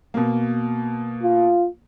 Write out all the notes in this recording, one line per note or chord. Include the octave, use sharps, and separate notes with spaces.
B2 A#3
F4